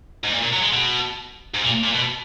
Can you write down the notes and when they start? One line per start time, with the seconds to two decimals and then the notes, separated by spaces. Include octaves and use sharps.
0.24 G#2
0.33 A#2
0.43 A#2
0.53 F#3
0.63 G#3
0.73 B2
1.54 G#2
1.64 A#2
1.84 A#2
1.95 B2